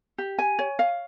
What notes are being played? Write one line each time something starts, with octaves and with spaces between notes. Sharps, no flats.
G4
G#5
C#5
F5